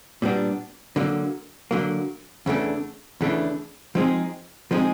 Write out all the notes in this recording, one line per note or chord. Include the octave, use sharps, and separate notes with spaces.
A#2 G3 B3 D4
D3 F#3 A#3
D3 F#3 A#3
E2 C#3 E3 A3 D4
E2 C#3 E3 A3 D4
F3 G#3 C4 D#4 G#4
F3 G#3 C4 D#4 G#4